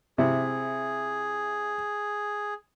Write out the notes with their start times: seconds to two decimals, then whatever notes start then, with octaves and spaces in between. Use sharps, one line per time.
0.18 C3 E4 G#4